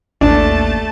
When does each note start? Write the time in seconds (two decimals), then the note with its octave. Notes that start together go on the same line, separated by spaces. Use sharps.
0.21 A1 D#2 A3 D4 A5